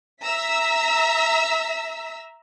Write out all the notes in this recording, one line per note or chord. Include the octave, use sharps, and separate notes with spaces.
E5 A#5 E6 B6